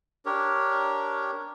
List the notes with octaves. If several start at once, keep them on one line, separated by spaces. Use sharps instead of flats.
D4 G4 A#4 C#5